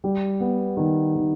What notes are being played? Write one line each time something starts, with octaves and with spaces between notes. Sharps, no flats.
G3
B3
D#3
D#3